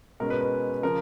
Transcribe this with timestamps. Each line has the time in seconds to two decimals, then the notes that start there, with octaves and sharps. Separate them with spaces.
0.20 B2 G#3 C#4 A#4
0.30 B4
0.41 B4
0.83 C#3 F3 A#4